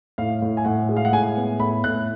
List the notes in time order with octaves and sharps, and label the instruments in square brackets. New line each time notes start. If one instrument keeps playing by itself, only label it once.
[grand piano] A2 F5
A2
G#5
A2 F#5
G#3
F5
F#5
A2 G#5
B3
A2 B5
A2 F#6